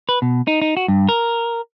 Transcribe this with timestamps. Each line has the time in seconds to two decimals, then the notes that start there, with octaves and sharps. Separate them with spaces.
0.09 B4
0.22 B2
0.47 D#4
0.62 D#4
0.77 F#4
0.88 G2
1.09 A#4